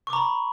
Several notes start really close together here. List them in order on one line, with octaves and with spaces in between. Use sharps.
C#6 D6 A#5 B5